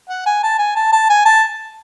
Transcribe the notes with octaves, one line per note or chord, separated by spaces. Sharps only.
F#5
G#5
A5
G#5
A5
A5
G#5
A5